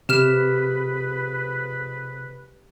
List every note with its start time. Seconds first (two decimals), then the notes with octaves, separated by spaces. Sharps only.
0.09 F2 C3 G4 G#4 B4 F6 E7